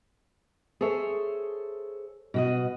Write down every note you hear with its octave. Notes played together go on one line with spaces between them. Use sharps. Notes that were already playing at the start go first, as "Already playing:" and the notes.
G#4 A4 C5 C#5 E5
B2 F#4 D#5